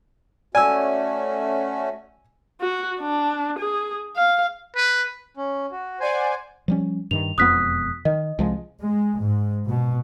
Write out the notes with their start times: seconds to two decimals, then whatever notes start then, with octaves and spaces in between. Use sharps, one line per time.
0.55 A3 C#4 F#4 D5 G#5 E6
2.61 F#4
3.00 D4
3.59 G#4
4.16 F5
4.76 B4
5.37 C#4
5.71 F#4
6.00 C5 D5 F#5 G#5
6.68 F3 G3 C#4
7.11 G2 D#3 F7
7.38 E1 F2 B3 D#6 F#6 B6
8.05 D#3 D#5
8.39 C2 F3 G#3
8.82 G#3
9.22 G#2
9.68 B2